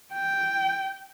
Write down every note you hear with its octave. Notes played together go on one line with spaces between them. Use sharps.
G5